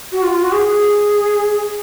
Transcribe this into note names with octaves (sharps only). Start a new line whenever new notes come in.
F#4
F4
F4
F#4
G#4